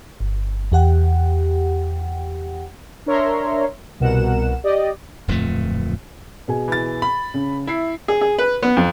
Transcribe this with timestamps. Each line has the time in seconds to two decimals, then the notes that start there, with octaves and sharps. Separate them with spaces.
0.20 G1
0.72 E2 G4 F#5 G5
3.06 D4 A#4 C#5 E5 A#5 C6
4.00 C2 B2 A#4 F#5 E7
4.64 G4 D5 D#5
5.28 D1 F2 A#2 A3
6.48 B2 G#4 G#5
6.68 E3 A6
7.02 B5
7.34 C#3
7.67 E4 E5 C7
8.08 G#4
8.21 G#4
8.39 B4
8.63 B3
8.77 F2